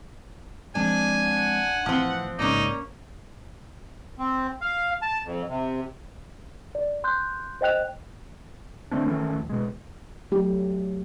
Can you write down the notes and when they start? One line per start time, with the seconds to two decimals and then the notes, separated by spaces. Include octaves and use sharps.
0.75 F3 G#3 C4 D4 G#5
1.23 F#5
1.86 A2 E3 F3 C4
2.39 A1 G#2 C#3 A#3 C#4 D#4 D5
4.19 C4
4.61 F5
5.02 A5
5.25 F2
5.49 C3
6.75 D5
7.04 C6 F#6 G6
7.61 C5 D#5 G5 F#6 F7
8.91 D3 A3 C4 D4
9.05 D#3 E3 A3 C#4
9.35 D1
9.50 B2 G#3
10.32 F#3 A3 G4